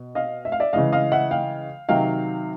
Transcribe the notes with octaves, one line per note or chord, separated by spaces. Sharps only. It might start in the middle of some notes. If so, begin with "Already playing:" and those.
Already playing: B2
D#5 F5
E5
F5
D5 E5
C#3 E3 G#3 D#5 F5
D#5 F5
E5 F#5
F5 G5
C3 D#3 F#3 F5 G5